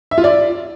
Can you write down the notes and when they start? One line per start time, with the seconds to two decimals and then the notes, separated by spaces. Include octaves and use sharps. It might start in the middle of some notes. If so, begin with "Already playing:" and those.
0.11 E5
0.18 F4
0.24 D5